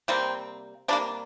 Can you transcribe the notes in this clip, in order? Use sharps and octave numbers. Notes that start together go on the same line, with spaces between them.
C3 G3 A#3 C4
C3 G3 A#3 D4